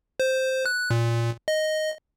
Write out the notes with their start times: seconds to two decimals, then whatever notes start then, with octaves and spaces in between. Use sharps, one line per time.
0.20 C5
0.66 F#6
0.90 A#2
1.48 D#5